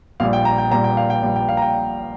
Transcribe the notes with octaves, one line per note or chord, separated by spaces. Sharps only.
A#1 A#2 G3 F5
G5
A#5
G5
A#1 A#2 G3 A#5
G5
F5
G5
A#1 A#2 G3
G5
F5
A#5
G5